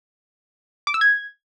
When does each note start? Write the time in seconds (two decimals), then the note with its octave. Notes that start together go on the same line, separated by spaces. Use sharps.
0.87 D6
0.94 E6
1.01 G#6